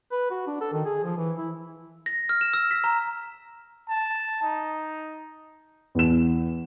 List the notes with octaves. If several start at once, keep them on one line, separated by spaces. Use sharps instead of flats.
B4
F#4
D4
A4
D#3
G#4
F3
E3
E4
A#6
F6
E7
E6
B6
A#5
A5
D#4
E2 E7